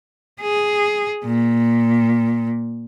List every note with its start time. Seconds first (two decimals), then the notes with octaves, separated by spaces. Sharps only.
0.41 G#4
1.25 A#2